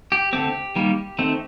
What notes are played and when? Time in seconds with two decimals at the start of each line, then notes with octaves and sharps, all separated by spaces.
0.12 G4
0.33 D3 A3 C4 G4
0.76 D#3 G3 A#3
1.18 D#3 A3 C4